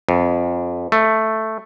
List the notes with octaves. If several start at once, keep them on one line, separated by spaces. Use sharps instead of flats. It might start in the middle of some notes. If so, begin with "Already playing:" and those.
F2
A3